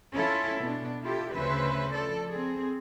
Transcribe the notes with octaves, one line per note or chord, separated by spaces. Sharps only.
C#4 E4 F4 A4
B2 B3 D4
E4 F4 G4 A4
D2 C#3 C#4 B4 C5 E5
F3 A4 D5
C4 G#4